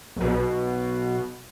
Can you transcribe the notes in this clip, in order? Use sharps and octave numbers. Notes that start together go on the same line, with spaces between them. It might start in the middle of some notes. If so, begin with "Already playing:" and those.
B1 B2